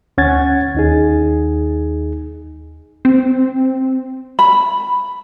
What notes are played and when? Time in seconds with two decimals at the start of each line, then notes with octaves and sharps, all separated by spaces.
0.18 D2 C#4 F#5 G#6 A6
0.75 D#2 D#4 G#4
3.05 C4
4.39 B5